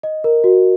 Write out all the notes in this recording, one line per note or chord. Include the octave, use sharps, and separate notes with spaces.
D#5
A#4
F#4